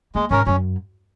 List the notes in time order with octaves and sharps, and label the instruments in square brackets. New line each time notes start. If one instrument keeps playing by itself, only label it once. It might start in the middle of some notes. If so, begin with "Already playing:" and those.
[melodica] G#3 [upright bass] A#3
[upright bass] G#2 [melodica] C#4 A#4
[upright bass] F#2 [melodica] C#4